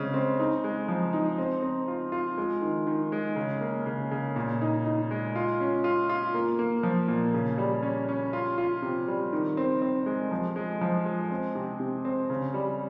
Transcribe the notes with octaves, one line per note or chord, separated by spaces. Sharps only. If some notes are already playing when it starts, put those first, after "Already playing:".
Already playing: C#3 G#3 C4
C4
D#4
G#3
F3
D#4
C4
C4
F4
F4
G#3
D#3
D#3
G#3
C#3
A#3
C#3
C#3
A#2
D#4
D#4
G#3
F4
C#4
F4
F4
A#3
A#3
F3
A#2
C#3
G3
C#4
C#4
F4
F4
C3
G3
D#3
C4
C4
G#3
F3
G#3
F3
G#3
C4
C3
C3
C4
C#3
G3